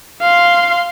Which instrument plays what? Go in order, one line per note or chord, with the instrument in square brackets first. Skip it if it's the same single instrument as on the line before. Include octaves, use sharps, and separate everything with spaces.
[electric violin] F5 C6